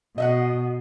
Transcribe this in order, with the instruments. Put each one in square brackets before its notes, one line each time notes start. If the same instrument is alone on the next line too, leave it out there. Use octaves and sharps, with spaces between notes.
[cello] B2 [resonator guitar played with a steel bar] D#5 E5 F#5